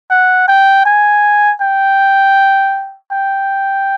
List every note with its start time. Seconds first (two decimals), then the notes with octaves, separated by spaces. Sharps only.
0.10 F#5
0.48 G5
0.85 G#5
1.61 G5
3.12 G5